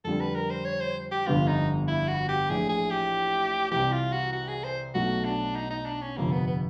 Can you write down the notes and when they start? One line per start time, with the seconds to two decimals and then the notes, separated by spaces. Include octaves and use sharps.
0.05 F2 D3 G3 A4
0.20 B4
0.35 A#4
0.50 C5
0.66 C#5
0.81 C5
1.11 G4
1.27 G1 F2 D3 G3 B3 F4
1.47 D#4
1.88 E4
2.08 F#4
2.29 G4
2.50 A#1 A2 E3 G#4
2.69 G#4
2.90 G4
3.71 C2 C3 E3 G4
3.92 F4
4.12 F#4
4.33 F#4
4.48 G#4
4.64 C5
4.94 B1 B2 F#3 A3 F#4
5.25 D4
5.55 D#4
5.70 D#4
5.86 D4
6.01 C#4
6.17 G1 F2 C3 A#3
6.32 B3
6.47 B3